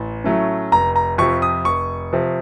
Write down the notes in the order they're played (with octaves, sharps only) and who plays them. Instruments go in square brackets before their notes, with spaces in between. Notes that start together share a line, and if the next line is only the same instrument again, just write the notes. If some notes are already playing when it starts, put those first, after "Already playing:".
Already playing: [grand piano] A1
A2 F#3 A3 C#4
F1 A#5
A#5
F2 C3 F3 C#6
D#6
F1 C#6
C3 F3